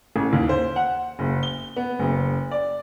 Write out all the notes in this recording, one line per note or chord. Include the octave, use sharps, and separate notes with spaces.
A1
D#2
C5
F#5
F#1
G7
B3
F#1
D5